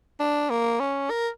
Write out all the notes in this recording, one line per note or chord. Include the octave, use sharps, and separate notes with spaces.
D4
A#3
C#4
A#4